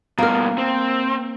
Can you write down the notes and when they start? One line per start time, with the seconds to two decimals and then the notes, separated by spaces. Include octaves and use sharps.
0.18 G2 B2 A#3 A#4
0.58 C4